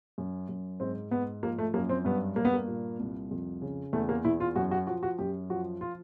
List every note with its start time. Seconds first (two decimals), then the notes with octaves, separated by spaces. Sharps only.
0.18 F#2
0.49 F#2
0.80 G#2 C4
1.11 G#2 B3
1.43 F3 A#3
1.58 A3
1.74 F#2 A#3
1.89 C4
2.05 G2 B3
2.36 G2 A#3
2.45 B3
2.53 A#3
2.68 A#2
2.99 C2
3.31 F2
3.62 C#3
3.93 E2 A3
4.09 A#3
4.25 E2 E4
4.40 F4
4.56 F#2 F#4
4.71 F#4
4.87 F3 F#4
5.03 F#4
5.19 F#2 G4
5.50 F3 F#4
5.81 F4